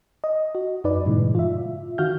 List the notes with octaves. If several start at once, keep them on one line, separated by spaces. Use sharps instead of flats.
D#5
F#4
F#2 D#4 B4 D5
G2 A#2 C#3 E3 G#3
F4 E5
D#3 F#4 F5 F6 G6